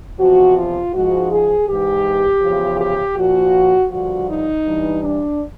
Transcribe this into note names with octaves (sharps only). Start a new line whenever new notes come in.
E2 C3 F3 F#4
F4
G#2 F3 F#4
G#4
G#2 E3 G4
E2 C#3 F3
G4
A#2 F3 F#4
G2 D3 F3 F#4
D#4
G2 E3
D4